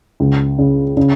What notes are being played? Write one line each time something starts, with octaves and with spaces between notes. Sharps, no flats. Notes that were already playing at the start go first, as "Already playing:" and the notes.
C#2
C#3
C#3